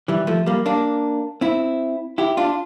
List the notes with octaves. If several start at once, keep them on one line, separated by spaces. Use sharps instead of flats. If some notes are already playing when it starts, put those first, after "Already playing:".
E3 G3
F3 A3
G3 A#3
A#3 D4
C4 E4
E4 G4
D4 F4